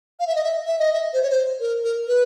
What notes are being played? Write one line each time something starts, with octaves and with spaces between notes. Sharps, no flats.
F5
E5
D#5
E5
E5
D#5
E5
C5
C#5
C5
A#4
A#4
B4